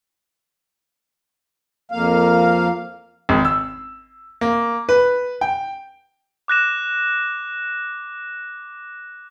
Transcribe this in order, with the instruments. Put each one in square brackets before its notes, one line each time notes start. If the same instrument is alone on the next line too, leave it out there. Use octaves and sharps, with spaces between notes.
[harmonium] F2 A#3 F5
[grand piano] G#1
E6
A#3
B4
G5
[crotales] D6 F#6 A#6 E7